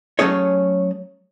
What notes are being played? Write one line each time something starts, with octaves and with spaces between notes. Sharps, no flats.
F#3 G#3 A3 C#4 G#4 C#5